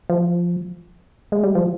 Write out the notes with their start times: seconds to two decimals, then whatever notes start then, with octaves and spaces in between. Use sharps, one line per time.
0.10 F3
1.32 G#3
1.43 G3
1.55 F3